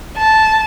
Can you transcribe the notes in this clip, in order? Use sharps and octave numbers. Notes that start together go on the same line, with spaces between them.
A5